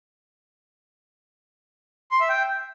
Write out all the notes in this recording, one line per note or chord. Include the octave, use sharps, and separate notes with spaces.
C6
E5
G5